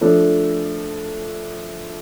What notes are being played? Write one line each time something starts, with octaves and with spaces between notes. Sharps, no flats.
F3 A3 D4 A4